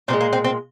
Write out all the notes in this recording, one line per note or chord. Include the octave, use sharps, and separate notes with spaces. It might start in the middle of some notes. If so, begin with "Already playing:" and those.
A#2 F3 G#3 C4
A#3
C4
C4